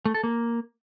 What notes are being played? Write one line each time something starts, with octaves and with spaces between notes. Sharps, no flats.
A3
A4
A#3